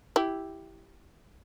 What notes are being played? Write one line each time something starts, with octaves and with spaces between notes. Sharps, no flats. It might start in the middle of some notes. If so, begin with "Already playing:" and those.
E4 G4